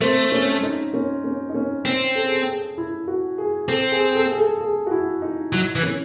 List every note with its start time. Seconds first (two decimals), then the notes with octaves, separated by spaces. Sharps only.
0.01 A3 C4
0.32 C#4
0.63 D#4
0.94 C#4
1.24 C#4
1.49 D#4
1.54 C#4
1.85 C4 C#4
2.15 A4
2.24 G#4
2.32 A4
2.46 G#4
2.78 E4
3.07 F#4
3.38 G#4
3.68 C4 A4
3.92 G#4
4.15 A4
4.32 G#4
4.38 A4
4.61 G#4
4.87 F#4
4.91 E4
5.22 D#4
5.53 F#3 E4
5.75 E3
5.83 C#4